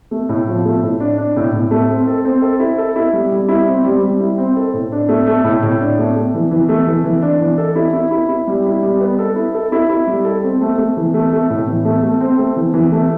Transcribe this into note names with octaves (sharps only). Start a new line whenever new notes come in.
A3
A2
F3
A3
A2
D4
D4
A2
A2
A3
C4
A4
C4
A4
E4
A4
E4
G3
G3
E4
C4
G3
G3
E4
C4
A4
A2
D4
A3
A3
A2
A2
D4
A3
A3
E3
E3
A3
E3
E3
D4
E3
A4
E4
E4
E4
E4
G3
E4
G3
B3
A4
E4
A4
E4
E4
G3
A4
C4
A3
A3
E3
A3
A3
A2
E3
A3
A3
C4
A3
E3
E3
A3